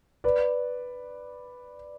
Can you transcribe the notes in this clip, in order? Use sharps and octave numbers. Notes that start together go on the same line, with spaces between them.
B4 D5